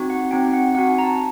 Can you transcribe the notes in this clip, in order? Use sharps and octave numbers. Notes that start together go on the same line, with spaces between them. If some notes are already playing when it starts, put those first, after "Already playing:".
Already playing: C4 D#4 F#4
F#5
C4 D#4 F#4 G5
F#5
C4 D#4 F#4 F#5
G#5
A#5
A5